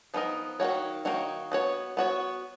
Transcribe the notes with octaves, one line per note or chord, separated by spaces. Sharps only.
F3 B3 D#4 A#4 D#5
D#3 A#3 D#4 F#4 C#5
D#3 A#3 D#4 F#4 C#5
B3 F#4 C#5
B3 F#4 C#5